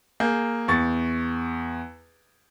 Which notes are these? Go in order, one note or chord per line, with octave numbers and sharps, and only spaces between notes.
A#3 G#4 G6
E2 C#6 A6